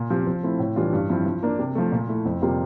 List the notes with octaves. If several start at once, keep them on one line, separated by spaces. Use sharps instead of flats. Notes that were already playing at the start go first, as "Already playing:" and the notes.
Already playing: A#2
F3 C4 G4
F3
A3 C4 E4
A2
E3 G3 D4 F4
G2
F3 C4 E4
F3
A#3 D4
C3
F3 A3
A#2
A3 E4
F2
C3 G3 A#3 F4